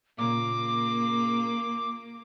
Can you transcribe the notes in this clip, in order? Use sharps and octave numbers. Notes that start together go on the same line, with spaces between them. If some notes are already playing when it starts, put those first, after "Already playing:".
A#2 C#3 A#3 D6